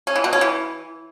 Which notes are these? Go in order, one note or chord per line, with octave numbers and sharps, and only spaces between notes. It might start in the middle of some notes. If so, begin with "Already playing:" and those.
C#4
E3
B2
C#4
E3